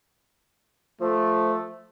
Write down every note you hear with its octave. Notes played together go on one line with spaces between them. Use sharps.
F3 A3